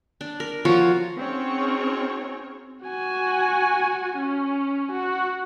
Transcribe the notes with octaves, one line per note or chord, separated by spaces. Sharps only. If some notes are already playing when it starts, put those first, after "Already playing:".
D4
A#4
F3 F4 F#4 C#5
C4 C#4 D#4 F#4 G#4 C#5
F#4 G#5
C#4
F#4